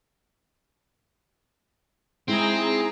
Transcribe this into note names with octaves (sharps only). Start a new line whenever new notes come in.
G#3 C4 D#4 E4 G#4 A#5